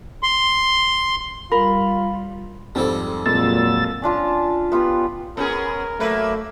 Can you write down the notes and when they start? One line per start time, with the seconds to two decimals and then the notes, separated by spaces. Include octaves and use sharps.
0.23 C6
1.52 G3 F4 A#4 B5
2.75 F2 G#2 G3 C4 A4
3.26 F2 A#2 F#3 G#3 E6 A6
4.02 C#4 D4 F4 A5
4.72 B3 F4 G4 B4
5.37 B3 C#4 G#4 A#4
6.00 F#3 A3 A#3 B4 E5